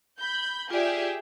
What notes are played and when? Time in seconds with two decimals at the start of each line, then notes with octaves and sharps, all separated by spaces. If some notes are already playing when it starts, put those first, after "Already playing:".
0.19 B5 G6
0.70 F4 G4 G#4 D5 E5